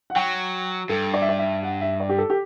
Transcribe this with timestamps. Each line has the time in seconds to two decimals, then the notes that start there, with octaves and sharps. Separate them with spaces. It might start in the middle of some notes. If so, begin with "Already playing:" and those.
0.10 F#5
0.16 F#3 G5
0.89 G2 A4
1.14 D5
1.22 E5
1.29 D5
1.39 E5
1.63 F#5
1.81 E5
2.00 D5
2.09 G4
2.18 A4
2.30 G4